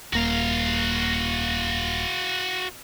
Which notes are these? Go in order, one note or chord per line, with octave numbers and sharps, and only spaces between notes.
D#1 A#3 F#4 F5